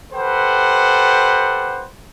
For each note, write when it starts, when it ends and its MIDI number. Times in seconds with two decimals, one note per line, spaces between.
0.13 1.86 67
0.13 1.86 69
0.13 1.86 71
0.13 1.86 72
0.13 1.86 78